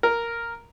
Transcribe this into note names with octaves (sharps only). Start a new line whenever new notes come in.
A#4